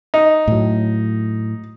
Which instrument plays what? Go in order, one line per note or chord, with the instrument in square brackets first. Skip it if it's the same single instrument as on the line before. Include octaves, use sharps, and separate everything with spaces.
[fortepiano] D#4
[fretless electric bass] A2 F#3